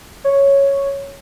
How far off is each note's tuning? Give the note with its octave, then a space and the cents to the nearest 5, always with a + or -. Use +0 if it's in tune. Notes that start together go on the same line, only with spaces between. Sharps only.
C#5 +0